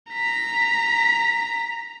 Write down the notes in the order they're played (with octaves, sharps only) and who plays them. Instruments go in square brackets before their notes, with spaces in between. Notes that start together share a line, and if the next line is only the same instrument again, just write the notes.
[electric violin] A#5 B6